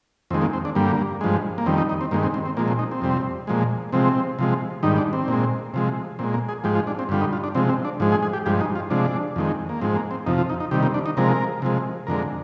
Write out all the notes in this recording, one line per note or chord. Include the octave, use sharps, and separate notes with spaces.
F2 D#3 G#3 C4
A#3
C4
D4
G2 D3 G3 A#3
G2 F3 G#3
A#3
F2 D#3 G3 C4
D#4
D#4
C4
G2 D#3 G#3 A#3
C4
C4
C4
A#2 F3 G#3 A#3
C4
D#4
C4
F2 C3 G3
A#2 F3 G#3
C3 F3 G#3 C4
C3 F3 G#3
G#2 D#3 G3 D#4
D4
C4
A#2 G#3
C3 F3 G#3
A#2 G#3 C4
A#3
G#4
G#2 F3 G#3 G4
F4
D4
C4
G2 D3 G3 F4
D#4
F4
D4
C3 F3 G#3 C4
C4
D4
G#2 F3 G#3
G#4
G#4
G4
G2 F3 G#3 G4
D#4
F4
C3 F3 G#3 D4
F2 D#3 G#3
A#3
G#2 F3 G#3 C4
A#3
C4
F2 C3 F3 D#4
F4
D#4
D#4
C3 D#3 G3 G4
A#3
D4
D#4
C3 F3 G#3 A#4
C3 F3 G#3
F2 D3 G#3 A#4